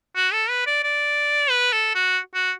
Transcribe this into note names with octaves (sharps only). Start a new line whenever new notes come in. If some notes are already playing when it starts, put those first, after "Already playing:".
F#4
A4
B4
D5
D5
B4
A4
F#4
F#4